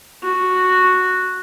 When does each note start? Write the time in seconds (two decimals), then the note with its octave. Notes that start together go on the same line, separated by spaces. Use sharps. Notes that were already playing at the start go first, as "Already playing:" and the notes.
0.23 F#4